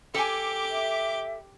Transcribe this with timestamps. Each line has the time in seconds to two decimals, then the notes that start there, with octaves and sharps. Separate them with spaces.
0.14 G4 A4 G#5 D6
0.71 E5